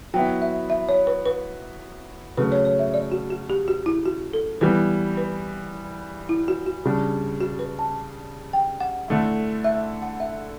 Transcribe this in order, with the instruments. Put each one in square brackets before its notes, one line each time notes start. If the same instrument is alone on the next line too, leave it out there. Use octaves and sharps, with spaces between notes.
[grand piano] F#3 B3 E4 [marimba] G5
[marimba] E5
E5
C#5
B4
B4
[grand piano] C#3 F#3 A3 [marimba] B4
[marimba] C#5
C#5
E5
D5
F#4
F#4
G4
F#4
E4
F#4
A4
[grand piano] E3 G3 B3 [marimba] B4
[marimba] B4
E4
F#4
F#4
[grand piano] C#3 G3 D4
[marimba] F#4
B4
A5
G5
F#5
[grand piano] D3 A3 E4
[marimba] E5
F#5
E5